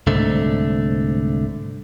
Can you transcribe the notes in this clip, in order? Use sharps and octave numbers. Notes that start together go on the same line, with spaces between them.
C2 G#2 D3 A3